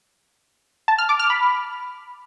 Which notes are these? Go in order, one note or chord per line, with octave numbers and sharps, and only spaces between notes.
A5
F6
D6
F6
B5